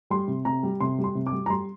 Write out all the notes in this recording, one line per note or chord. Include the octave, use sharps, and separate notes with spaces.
G3 C6
C3
C3 A#5
G3
C3 C6
G3
C6
C3
D6
G3
A#5
G3 C6